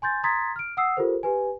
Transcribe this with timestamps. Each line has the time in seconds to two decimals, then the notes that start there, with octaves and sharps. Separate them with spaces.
0.02 G#5 C6 G6 A6
0.23 A#5 C6 D#6 G#6 A6 B6
0.56 F6 D7
0.77 F#5 D#6 E6 C7
0.97 F4 G4 A4 A#4 C5
1.23 G4 B4 G#5